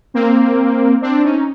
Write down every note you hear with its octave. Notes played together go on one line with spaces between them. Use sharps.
A#3 C4
C4 D4
C#4 D#4